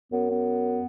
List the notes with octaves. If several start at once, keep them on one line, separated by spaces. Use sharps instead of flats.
F#2 B3
B3